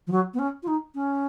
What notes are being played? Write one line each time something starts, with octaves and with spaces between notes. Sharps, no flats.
F3
F#3
B3
C#4
F4
D#4
C#4